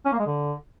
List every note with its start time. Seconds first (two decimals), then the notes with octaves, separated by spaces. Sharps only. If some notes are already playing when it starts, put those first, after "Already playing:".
0.05 C#4
0.12 A#3
0.19 G#3
0.27 D3